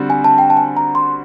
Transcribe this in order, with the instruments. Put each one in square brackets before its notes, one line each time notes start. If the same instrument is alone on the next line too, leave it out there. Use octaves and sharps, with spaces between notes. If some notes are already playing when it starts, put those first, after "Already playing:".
Already playing: [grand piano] D3 G3 C4 F#4
[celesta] G#5
A5
G5
A5
G#5
A#5
C6